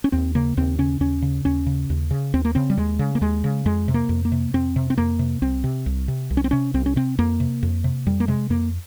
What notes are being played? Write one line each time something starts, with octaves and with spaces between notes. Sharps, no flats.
C#4
D#2 C4
C#3 A#3
D#2 C4
C#3 C#4
D#2 C#4
C#3
D#2 C#4
C#3
D#2
C#3
D#2 C4
A#3
C#3 C4
G3
D#2 G#3
C#3
A#3
D#2 G#3
C#3
F2 G#3
C3
A#3
F2
A#3
C3
F2 C4
C3
C4
F2 A#3
C3
C2 C4
C3
C2
C3
C2
C#4
C4
C3 C#4
C2 C4
C#4
C3 C4
F2 A#3
C3
F2
C3
F2 G3
A#3
C3 G#3
F2 A#3